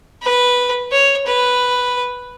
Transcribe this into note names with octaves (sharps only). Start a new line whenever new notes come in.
B4
C#5
B4